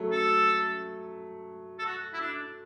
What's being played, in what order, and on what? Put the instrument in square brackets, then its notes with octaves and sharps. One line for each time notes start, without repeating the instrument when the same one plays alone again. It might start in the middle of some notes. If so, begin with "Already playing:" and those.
Already playing: [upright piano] F#3 A3
[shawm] A4
A4
F#4
E4
D4